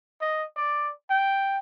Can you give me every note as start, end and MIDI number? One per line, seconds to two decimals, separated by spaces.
0.21 0.45 75
0.56 0.91 74
1.10 1.59 79